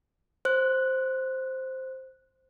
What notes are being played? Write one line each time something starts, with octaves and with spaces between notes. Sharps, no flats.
C5 F#6